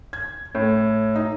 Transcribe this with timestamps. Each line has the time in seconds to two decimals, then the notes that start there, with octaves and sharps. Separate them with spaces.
0.13 G#6
0.55 A2
1.16 D#4